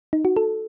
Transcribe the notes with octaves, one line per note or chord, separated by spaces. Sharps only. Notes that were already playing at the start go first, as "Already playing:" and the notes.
D#4
F#4
A4